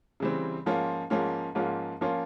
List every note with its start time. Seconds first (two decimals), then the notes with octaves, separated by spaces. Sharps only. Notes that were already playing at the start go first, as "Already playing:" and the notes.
0.20 C#3 E3 G3 C4
0.66 G#2 F3 A#3 C#4 F4
1.10 G#2 F3 A#3 C#4 F4
1.55 G#2 F3 A#3 C#4 F4
2.01 F3 A#3 C#4 F4